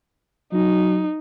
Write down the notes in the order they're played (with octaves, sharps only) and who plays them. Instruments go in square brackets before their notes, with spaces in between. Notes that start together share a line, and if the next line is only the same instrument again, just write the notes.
[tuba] F#3 [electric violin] D#4